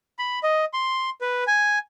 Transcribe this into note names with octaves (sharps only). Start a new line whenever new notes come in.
B5
D#5
C6
B4
G#5